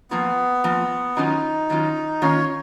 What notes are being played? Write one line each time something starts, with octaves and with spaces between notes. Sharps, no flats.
F3 A#3 B3 F4
F3 A#3 F4
D#3 F#3 C#4 D#4 F4
D#3 F#3 C#4 F4
D#3 A#3 C#4 F4 C#5